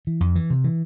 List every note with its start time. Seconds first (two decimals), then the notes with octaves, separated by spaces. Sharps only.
0.07 E3
0.20 F2
0.35 E3
0.50 C3
0.64 E3